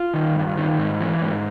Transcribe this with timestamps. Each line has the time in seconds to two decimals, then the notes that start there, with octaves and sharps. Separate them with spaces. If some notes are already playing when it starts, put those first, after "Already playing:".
Already playing: F4
0.14 D#3
0.36 G2
0.57 D#3
0.79 G#2
1.01 E3
1.22 G#2